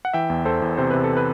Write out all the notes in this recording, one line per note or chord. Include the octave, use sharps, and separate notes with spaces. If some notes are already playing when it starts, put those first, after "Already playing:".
F#5
E3 E5 G5
E2
E2 A4 C5
E2
C3 C5
C3 B4
A4
B4